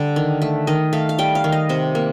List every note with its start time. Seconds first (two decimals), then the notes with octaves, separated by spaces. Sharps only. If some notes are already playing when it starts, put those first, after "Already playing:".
Already playing: D3 G3
0.16 D#3
0.42 A3
0.67 D#3 D#5
0.93 A3 F5
1.09 F5
1.18 G3 G5
1.35 F5
1.44 D#3
1.52 D#5
1.69 C3 C5
1.95 A#3